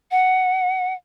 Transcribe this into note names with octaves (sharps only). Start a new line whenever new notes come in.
F#5